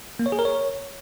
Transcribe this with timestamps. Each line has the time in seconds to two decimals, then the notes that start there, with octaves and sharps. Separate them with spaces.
0.19 A#3
0.26 C#5
0.32 G#4
0.39 A#4
0.45 C#5